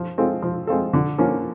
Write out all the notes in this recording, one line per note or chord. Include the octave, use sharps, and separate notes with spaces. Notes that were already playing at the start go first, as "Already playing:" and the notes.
Already playing: F3
G#3 C4 F4 A4
F3
G#3 C4 F4 A4
D3
F3 A#3 C#4